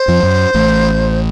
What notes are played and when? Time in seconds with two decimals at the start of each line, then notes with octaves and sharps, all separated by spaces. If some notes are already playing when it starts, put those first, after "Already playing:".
Already playing: C5
0.08 F2 F3
0.23 F#2
0.54 A1 A2